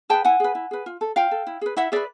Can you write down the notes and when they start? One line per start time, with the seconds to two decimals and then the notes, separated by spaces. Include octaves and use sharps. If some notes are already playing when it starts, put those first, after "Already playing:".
0.10 G#4 B4 G5 A5
0.25 E4 F#5 G#5
0.40 G#4 B4
0.55 E4
0.71 G#4 B4
0.86 F4
1.01 A4
1.16 F4 F5 G5
1.31 A4
1.47 E4
1.61 G#4 B4
1.77 E4 E5 F#5
1.92 G#4 B4 D5 E5